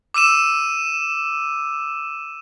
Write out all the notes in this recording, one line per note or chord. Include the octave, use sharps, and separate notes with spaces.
D6 E6 D#7 E7